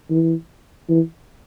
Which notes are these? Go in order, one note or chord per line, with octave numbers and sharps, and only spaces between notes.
E3
E3